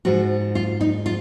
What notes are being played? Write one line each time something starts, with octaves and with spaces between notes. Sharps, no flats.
G#2 F3 G#3 F#4
F4
D#4
F4